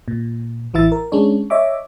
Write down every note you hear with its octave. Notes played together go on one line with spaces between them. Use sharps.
A#2
A1 E3 E4 E5 A6
A#4
G#3 C#4 D4 C#5
C#5 D#5 E5 D6